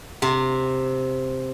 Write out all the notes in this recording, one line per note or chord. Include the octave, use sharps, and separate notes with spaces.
C3